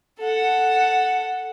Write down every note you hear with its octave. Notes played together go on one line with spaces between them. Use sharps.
A4 F#5